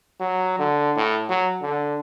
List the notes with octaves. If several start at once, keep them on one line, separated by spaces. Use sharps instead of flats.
F#3
D3
A2
F#3
D3